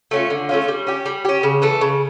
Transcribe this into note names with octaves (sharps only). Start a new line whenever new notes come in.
A3 C#4 F4
D3
A3 C#4 F4
G3
C#4 G4
G3
C#4 G4
C#3
E3 A3
C#3